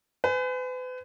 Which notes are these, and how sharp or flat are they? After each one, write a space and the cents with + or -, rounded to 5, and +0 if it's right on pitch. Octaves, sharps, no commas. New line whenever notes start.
B4 +40 G#5 +5